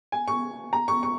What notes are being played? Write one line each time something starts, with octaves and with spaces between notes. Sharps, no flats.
G#5
C#6
A#5
C#6
C#6